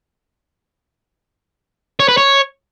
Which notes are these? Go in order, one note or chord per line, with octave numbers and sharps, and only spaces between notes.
C#5
B4
C#5